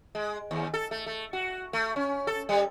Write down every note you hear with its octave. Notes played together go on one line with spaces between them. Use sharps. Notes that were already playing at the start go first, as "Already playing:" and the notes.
G#3
D#2
A4
A3
A3
F#4
A3
C#4
A4
G3